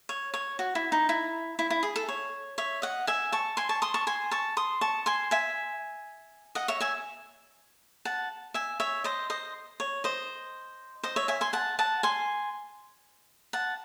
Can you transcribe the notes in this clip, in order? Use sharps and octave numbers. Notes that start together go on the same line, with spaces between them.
C#5
C#5
F#4
E4
D#4
E4
E4
E4
G#4
A4
C#5
C#5 E5
D#5 F#5
E5 G#5
A5 C#6
G#5 C6
A5 C#6
C6 D#6
A5 C#6
G#5 C6
A5 C#6
C6 D#6
A5 C#6
G#5 C6
E5 G#5
D#5 F#5
C#5 E5
E5 G#5
F#5 A5
E5 G#5
C#5 E5
C5 D#5
C5 D#5
C#5
C5 D#5
C5 D#5
C#5 E5
E5 G#5
G#5 C6
F#5 A5
F#5 A5
G#5 C6
F#5 A5